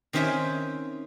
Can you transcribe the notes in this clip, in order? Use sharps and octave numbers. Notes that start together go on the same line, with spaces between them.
D#3 C4 C#4 C5 E5 G#5